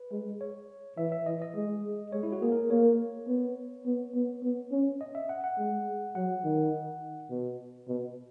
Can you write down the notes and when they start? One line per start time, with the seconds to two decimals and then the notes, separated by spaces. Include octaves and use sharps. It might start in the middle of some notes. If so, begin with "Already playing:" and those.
Already playing: B4
0.12 G#3
0.41 C#5
0.98 E3 E5
1.12 E5
1.26 E3 D#5
1.42 D#5
1.55 G#3
2.12 G#3 C#5
2.23 E4
2.32 F#4
2.42 A#3 G#4
2.52 A#4
2.71 A#3 C#5
3.28 B3
3.86 B3
4.14 B3
4.43 B3
4.72 C#4
5.01 D#5
5.15 E5
5.29 F#5
5.44 F#5
5.59 G#3
6.15 F#3 F#5
6.44 D#3
7.30 B2
7.88 B2